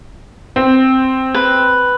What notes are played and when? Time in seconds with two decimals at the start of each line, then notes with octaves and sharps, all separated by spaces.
0.56 C4
1.34 B4